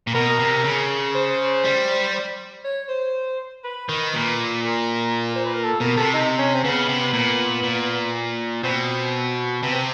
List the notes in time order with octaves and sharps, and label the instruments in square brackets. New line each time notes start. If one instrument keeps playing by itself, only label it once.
[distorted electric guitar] A#2
[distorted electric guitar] B2 [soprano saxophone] A#4
[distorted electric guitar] C3
C#3
[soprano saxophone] C5
[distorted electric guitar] G3
[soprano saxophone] C#5
C5
B4
[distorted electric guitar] D#3
A#2
[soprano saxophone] A#4
C5
B4
A#4
A4
[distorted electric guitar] B2 [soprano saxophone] A#4
[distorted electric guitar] C3 [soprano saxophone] A4
[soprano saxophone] D#4
C#4
C4
[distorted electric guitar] C#3 [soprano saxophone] B3
[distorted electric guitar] C3
A#2
A#2
[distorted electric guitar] B2 [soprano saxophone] C4
[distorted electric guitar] C3 [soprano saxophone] B3
[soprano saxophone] C4